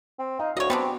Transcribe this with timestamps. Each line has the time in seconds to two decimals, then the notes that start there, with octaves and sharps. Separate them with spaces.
0.19 C4
0.39 D#4 F5
0.57 D2 F#4 C#5 D#5
0.70 G3 G#3 B3 C4 D4